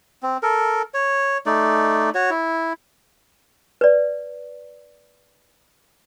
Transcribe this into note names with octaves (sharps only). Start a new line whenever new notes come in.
C4
A4 A#4
C#5
A3 D#4 D5
F#4 C#5
E4
B4 D5